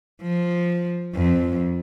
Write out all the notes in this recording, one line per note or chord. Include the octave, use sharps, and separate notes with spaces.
F3
F2